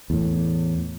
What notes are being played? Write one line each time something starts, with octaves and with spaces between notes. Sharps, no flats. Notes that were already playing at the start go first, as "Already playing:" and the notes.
E2 A2